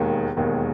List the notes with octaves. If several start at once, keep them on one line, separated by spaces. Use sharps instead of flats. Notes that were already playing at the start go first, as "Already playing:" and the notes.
Already playing: E1 D#2 D#3 G#3
E1 D#2 D#3 G#3